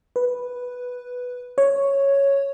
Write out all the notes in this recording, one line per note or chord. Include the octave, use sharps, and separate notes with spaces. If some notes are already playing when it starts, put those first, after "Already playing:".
B4
C#5